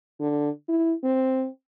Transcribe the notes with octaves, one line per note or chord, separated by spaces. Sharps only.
D3
E4
C4